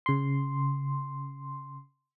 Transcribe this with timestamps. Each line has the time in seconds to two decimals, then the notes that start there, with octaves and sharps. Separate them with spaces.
0.06 C#3 C6